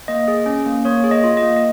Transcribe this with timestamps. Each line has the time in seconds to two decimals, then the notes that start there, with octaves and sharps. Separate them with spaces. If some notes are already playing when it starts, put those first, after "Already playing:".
0.08 A#3 D#5
0.28 G#4
0.46 C#4
0.66 A#3
0.85 A#3 C#5
1.04 G#4
1.11 D#5
1.24 F4
1.37 D#5
1.43 A#3
1.56 D#5